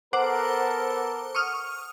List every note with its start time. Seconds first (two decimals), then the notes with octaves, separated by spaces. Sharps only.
0.13 B3 A4 A#4 C5 F#5 D6
1.35 C#6 D#6 F6